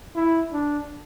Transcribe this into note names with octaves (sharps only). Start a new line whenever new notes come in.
E4
D4